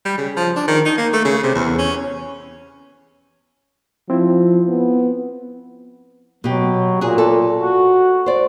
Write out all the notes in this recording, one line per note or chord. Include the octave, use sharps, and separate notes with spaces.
G3
C#3
F3
D4
D#3
D#4
A#3
A3
C#3
C3
E2
C#4
F3 C4 E4
B3
B2 F#3 G4
A#2 F#4 G#4
A4
F#4
C5 D5